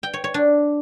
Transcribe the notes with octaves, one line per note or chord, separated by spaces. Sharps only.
G5
C#5
C#5
D4